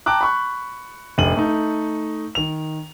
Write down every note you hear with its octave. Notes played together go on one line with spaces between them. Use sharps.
G5 A5 A#5 D6 F#6
B5 C#6 F#6
F1 A#1 D#7 F#7
A3 D#4
D#3 F7